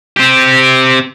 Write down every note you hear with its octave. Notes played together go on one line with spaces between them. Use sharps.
C4 G4